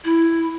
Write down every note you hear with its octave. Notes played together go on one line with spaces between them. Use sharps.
E4